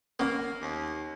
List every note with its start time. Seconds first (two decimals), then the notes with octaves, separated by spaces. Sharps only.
0.19 A#3 B3 C#4
0.62 D#2